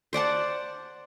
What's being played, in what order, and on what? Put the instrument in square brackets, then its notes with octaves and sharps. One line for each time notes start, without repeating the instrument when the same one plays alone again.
[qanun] C5 D5 F#5 A5